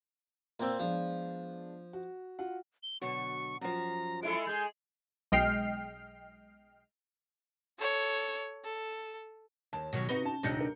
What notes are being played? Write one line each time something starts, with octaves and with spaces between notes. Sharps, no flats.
A#2 C4 A#4 G5 E6
F3 G#3 B3 D4
F#4
F4 F#4 F#5
G7
B2 D3 F#3 C#6
F#2 F3 A#5
G#3 E4 A4 D7
G#3 G#4 G6
B1 G#3 D#5 G5 F6 C7
A4 C#5
A4
D#2 A5
B2 D#3 F#3
C3 D#4 F#4 B4 G7
C#4 A5
D#1 C3 D4 D#4 G6 C#7
A#4